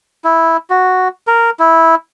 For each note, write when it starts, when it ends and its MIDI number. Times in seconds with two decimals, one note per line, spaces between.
0.24 0.57 64
0.70 1.08 66
1.27 1.50 70
1.60 1.95 64